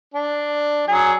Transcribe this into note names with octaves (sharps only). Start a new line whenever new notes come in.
D4
F#3 G#4